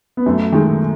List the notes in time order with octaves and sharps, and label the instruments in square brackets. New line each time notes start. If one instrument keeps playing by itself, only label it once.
[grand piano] B3
[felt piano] F#2 [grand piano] A3
[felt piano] D#3 G#3